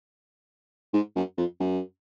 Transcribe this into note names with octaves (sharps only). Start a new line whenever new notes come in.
G#2
F#2
F2
F#2